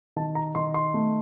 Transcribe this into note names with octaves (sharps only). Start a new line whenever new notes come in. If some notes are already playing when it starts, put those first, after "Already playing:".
D#3 A5
A#5
D#3 C6
C6
A3